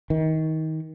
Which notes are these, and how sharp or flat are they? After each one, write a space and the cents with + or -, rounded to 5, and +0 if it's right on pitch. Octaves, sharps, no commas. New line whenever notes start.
D#3 +25